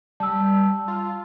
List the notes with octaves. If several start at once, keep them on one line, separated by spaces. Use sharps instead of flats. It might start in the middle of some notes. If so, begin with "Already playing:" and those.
G3 A5 E6
F4